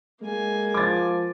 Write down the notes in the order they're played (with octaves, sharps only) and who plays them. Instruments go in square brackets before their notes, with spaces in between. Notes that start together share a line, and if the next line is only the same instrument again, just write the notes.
[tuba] G#3 [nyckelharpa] A#3 G#5
[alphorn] F3 [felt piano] D6 A6